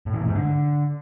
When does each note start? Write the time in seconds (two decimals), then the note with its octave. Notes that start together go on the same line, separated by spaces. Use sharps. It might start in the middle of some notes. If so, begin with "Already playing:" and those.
0.06 A2
0.13 E3
0.21 A#2
0.28 G#2
0.35 D3